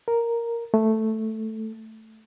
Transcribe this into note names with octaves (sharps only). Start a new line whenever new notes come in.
A#4
A3